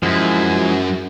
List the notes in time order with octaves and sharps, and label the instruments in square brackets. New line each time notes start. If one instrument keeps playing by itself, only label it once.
[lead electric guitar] F#2 [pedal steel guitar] F3 G#3 E4